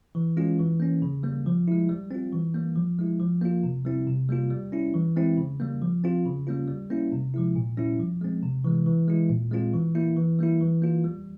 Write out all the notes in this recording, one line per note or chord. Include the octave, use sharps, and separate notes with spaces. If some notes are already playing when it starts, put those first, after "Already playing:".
E3
G#3 C#4 F4
E3
A#3 C#4
C#3
G3 A#3
F3
G#3 E4
G3
C4 F4
E3
G3 A#3
F3
G#3 E4
F3
A#3 F4
C3
G3 C4 E4
C3
G3 A#3 F4
G3
C#4 E4
E3
G#3 C4 E4
C#3
G3 A#3
F3
C4 F4
C#3
G3 A#3 C#4 F4
G3
A#3 C#4 E4
C3
F3 G#3 E4
A#2
G3 C#4 E4
F3
G#3 C4
C3
E3 G#3
E3
G#3 E4
A#2
G#3 C4 F4
E3
A#3 E4
E3
G3 A#3 E4
E3
A#3 F4
G3